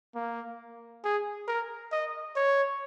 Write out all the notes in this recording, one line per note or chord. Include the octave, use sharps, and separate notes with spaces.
A#3
G#4
A#4
D#5
C#5